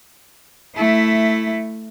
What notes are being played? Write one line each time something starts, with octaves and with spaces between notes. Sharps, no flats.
A3 E4